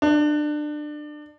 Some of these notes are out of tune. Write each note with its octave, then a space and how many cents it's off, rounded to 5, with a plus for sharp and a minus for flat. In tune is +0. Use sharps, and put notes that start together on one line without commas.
D4 +25